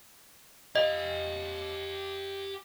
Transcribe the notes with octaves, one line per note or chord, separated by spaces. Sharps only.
G4 D#5 F5